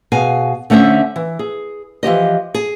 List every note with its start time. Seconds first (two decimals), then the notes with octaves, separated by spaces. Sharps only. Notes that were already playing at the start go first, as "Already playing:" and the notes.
0.12 B2 G#4 F5 G#5
0.70 D3 A3 C#4 C5 E5
1.16 E3
1.39 G#4
2.03 E3 F3 G4 D#5
2.54 G#4